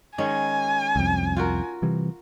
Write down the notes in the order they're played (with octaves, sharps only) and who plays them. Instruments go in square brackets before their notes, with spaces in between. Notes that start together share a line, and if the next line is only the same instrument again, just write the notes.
[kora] D#3 G#3 C#4 [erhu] G#5
[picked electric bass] C2 F2
[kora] F4 F#4 A#4
[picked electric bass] C3 E3 G3